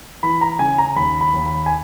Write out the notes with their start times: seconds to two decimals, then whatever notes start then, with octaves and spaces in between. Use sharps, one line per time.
0.23 E3 B5
0.41 A#5
0.59 C#3 G#5
0.78 A#5
0.96 D#2 B5
1.21 B5
1.34 D#2
1.46 B5
1.66 G#5